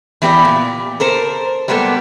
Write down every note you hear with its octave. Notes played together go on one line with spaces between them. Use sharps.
E3 B3 G4 B4 D5
A#2
A4 A#4 C5
G3 G#3 A#3 B3 A4